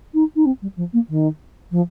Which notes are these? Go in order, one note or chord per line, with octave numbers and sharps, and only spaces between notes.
D#4
D#4
C4
G3
F3
A#3
D#3
F3